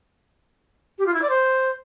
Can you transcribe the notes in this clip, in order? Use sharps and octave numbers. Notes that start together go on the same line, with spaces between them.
G4
F4
E4
D5
C5